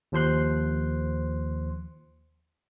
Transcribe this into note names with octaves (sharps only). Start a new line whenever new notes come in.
D#2 F3 C5 C6 F#6